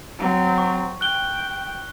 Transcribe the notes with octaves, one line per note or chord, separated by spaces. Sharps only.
F#3 C4
C#6
G5 F#6 G7